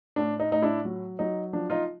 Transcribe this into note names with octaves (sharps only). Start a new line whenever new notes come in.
A2 D4
D#4
A2 D#4
D4 E4
F#3
F#3 D#4
F3 D4
D#4 F4